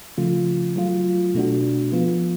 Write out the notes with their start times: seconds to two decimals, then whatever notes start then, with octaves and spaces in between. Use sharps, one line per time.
0.18 C#3 F3 A3 F4
0.76 F#3 A3 F4
1.34 B2 A3 D4 F#4
1.92 F3 B3 F4